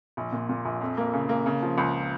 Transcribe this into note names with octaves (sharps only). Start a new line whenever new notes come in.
A#1
A#2
A#2
A#1
F2
A#3
C#3
A#3
C#3
F3
C#2